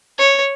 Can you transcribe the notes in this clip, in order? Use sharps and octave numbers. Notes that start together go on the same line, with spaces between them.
C#5